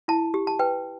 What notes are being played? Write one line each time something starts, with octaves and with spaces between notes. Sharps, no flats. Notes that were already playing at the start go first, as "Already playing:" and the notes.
E4 A5
G4
A5
B4 G5